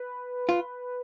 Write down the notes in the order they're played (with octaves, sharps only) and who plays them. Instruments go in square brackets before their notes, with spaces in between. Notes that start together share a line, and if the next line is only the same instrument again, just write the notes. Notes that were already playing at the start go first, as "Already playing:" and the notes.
Already playing: [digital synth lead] B4
[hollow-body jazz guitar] F4